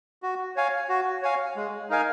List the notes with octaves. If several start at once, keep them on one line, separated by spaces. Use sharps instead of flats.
F#4
C#5 F5 G#5
F#4
C#5 F5 G#5
G#3
D#4 A#4 F5 G#5